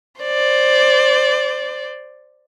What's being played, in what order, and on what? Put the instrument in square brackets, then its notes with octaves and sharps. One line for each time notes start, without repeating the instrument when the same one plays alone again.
[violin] C5 D5